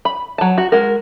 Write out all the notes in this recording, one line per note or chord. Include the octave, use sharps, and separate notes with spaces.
B5
F#3 A5
F#4
G#3 F#4 A#4